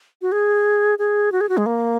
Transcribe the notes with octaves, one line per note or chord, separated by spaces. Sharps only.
F#4
G#4
G#4
F#4
G#4
F#4
G#3
A#3